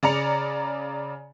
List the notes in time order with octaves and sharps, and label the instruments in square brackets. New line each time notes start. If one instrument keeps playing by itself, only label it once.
[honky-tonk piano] C#3 D5 A#5 C#7 F7